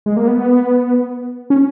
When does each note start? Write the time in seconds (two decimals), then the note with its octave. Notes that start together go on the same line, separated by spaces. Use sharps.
0.06 G#3
0.17 A#3
0.28 B3
1.50 C#4